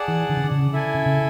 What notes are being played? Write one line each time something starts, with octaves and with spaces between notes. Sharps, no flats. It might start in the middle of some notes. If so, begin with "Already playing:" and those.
Already playing: G#4 D5 F#5 A5
E3
D3
C#3
D3
C#3
E4 A4 E5 G#5
C#3
C#3